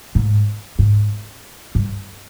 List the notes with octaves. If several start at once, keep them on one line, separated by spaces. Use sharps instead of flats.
G#2
G#2
G2